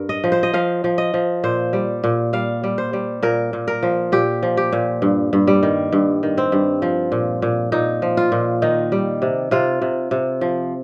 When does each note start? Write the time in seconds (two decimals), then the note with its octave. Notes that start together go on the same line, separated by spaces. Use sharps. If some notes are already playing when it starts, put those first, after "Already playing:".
Already playing: G2 A#4
0.09 D#5
0.24 F3
0.32 C5
0.43 D#5
0.54 F3 F5
0.84 F3
0.98 D#5
1.14 F3
1.44 A#2 C5
1.73 G3
2.04 A#2
2.33 G3 F5
2.64 G3
2.78 C5
2.93 G3
3.23 A#2 A#4
3.53 A#2
3.68 A#4
3.83 F3
4.12 A#2 G4
4.43 F3
4.57 G4
4.73 A#2
5.02 G2
5.33 G2
5.47 G3
5.63 D#3
5.92 G2
6.23 D#3
6.38 C4
6.52 G2
6.82 F3
7.12 A#2
7.42 A#2
7.72 A#2 D#4
8.02 F3
8.17 F4
8.32 A#2
8.62 D#3 D#4
8.92 G3
9.22 C3
9.51 C3 F4
9.82 C3
10.11 C3
10.41 F3